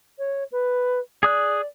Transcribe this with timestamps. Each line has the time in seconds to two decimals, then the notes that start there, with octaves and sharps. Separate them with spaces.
0.19 C#5
0.52 B4
1.23 G#4 D5 D#6 F#6